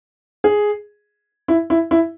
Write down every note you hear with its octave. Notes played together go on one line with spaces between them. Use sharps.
G#4
E4
E4
E4